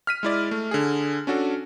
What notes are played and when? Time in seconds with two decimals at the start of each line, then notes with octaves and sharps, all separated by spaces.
0.07 F6 B6 D#7
0.23 G#3 E4 D5
0.51 A3
0.71 D3 G#4
1.27 C#4 D4 F#4 A4